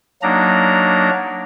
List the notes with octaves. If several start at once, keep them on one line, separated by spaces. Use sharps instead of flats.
F#3 A#3 D4 D#4 A#5